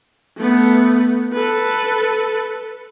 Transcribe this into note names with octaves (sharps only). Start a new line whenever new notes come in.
A3 B3
A4 B4